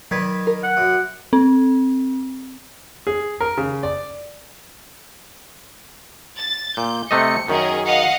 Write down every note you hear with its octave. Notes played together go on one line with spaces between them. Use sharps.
D#3 F#3 B4 G#6 B6
A#4
F#5
F#2
C4
G#4
A#4
C#3
D5
A6
A#2 G6
C3 A3 D#5 C#7
F#2 D#3 C#4 G#4 A#4
D#5 F5 F#5